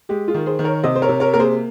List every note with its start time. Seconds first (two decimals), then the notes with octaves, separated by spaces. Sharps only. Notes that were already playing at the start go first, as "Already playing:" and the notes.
0.09 G#3 G4
0.28 F4 G#4
0.34 D#3
0.46 G#4 C5
0.59 D#3
0.64 A#4 C#5
0.83 C3 C5 D#5
0.95 C5
1.02 A#4 C#5
1.09 C3
1.20 A#4 C#5
1.33 A#3 A#4
1.39 G#4 C5